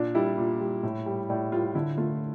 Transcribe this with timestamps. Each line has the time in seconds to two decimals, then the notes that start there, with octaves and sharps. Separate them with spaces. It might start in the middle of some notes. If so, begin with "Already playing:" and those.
Already playing: A#2 D4
0.15 G3 E4
0.38 A#2
0.61 G3
0.83 A2
1.06 G3
1.29 A2 D5
1.52 G3 F4
1.75 D3 E4
1.98 A3 F4